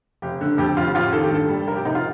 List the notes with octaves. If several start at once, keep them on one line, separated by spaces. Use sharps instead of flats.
F1 G4
D3
F2 G4
F1 F4
A1 F4
D#3 A4
G4
G2 A4
G3
F1 A#4
G4
C3 D#4
F4